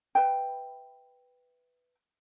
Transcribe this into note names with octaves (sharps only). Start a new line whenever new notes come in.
B4 E5 G5